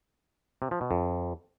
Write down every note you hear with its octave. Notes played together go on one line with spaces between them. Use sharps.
C3
F3
B2
F2